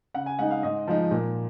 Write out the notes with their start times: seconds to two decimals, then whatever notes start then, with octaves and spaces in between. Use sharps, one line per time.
0.14 C#3 F#5
0.26 G#5
0.39 G#3 D#4 F#5
0.51 F5
0.63 G#2 D#5
0.87 F3 G#3 D#4
1.11 A#2